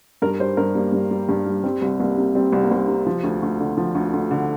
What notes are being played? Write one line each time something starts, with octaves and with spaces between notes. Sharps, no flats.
G2 A#4
G3 C5
G2 A#4
G3 A#3
G2
G3
G2
G3
G3 C4
C2
C2 A#3
C3
G3 C4
C2
A#3
C2 C4
C3
F3
D2
D2
D3
F3
D2
D2
D3